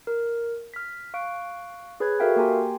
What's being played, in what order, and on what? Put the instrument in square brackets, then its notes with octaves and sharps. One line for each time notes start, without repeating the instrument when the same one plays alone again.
[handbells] A#4
F6 B6
F5 C#6 F#6 D7
G#4 B4 C#5 B5 F#6 G#6
F#4 A4 A#4 E5 F5 G5
A#3 G4 G5 G#5 A#5 C6